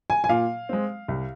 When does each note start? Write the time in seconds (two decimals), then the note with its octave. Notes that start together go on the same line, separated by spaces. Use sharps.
0.10 G#5
0.24 G#5
0.29 A#2 F5
0.69 G#3 C4
1.08 C2